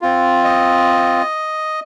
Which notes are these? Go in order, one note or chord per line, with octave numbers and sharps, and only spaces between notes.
C4 F4
D#5